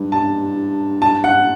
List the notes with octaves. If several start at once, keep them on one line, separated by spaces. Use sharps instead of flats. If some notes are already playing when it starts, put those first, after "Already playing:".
Already playing: G2
A5
A5
F#5